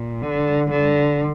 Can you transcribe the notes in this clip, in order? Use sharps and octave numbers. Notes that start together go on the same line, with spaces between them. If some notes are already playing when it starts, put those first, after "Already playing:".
Already playing: A#2
D3
D3